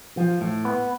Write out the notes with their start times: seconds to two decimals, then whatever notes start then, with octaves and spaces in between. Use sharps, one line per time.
0.17 F3
0.41 A2
0.65 B3